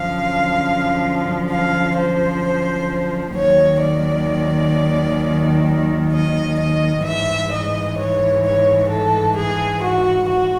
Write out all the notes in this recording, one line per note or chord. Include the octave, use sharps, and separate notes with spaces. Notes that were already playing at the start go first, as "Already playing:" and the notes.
Already playing: F#2 D3 F3 F5
F5
C5
D#2 D#3 F#3 C#5
D5
D#5
D#5
G#2 E3 E5
D#5
C#5
C#5
A4
G#4
F#4
F#4